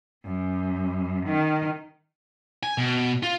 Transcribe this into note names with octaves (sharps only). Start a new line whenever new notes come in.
F#2
D#3
G#5
B2
F4